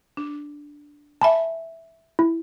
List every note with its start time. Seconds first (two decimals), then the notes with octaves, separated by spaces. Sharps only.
0.17 D4
1.21 E5 G#5 A5 B5
2.19 E4